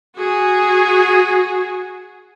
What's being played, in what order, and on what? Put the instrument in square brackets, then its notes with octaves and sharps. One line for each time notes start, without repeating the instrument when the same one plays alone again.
[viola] F#4 G#4